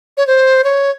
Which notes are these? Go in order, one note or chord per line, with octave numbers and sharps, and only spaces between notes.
C#5
C5
C#5